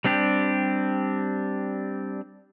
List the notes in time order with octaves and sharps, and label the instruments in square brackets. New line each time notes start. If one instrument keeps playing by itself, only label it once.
[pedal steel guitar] G3 C4 D4 G4